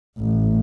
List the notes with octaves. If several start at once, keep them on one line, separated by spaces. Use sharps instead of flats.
A1